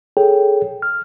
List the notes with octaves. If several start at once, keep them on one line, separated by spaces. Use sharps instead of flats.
G#4 A4 C#5 G5
F6